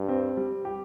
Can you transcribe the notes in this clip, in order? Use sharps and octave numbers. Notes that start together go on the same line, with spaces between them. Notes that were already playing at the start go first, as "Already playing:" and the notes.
Already playing: G2
C4
G3
G4